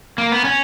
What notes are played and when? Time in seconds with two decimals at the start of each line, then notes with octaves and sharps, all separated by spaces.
0.18 A#3
0.32 B3
0.44 C#4